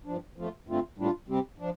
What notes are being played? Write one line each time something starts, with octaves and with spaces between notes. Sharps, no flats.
G2 F3 D4
F2 F3 A3 F4
G2 D3 A3 C4 F4
A2 G3 D4 F4
C3 G3 C4 G4
F3 D4